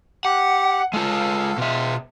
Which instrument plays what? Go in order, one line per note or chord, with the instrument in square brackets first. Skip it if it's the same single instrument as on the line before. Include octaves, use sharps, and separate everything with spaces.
[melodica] G4 [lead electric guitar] F#5
[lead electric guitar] G#3 F4 [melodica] A4 F5
[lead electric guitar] B2 E5 [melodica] F4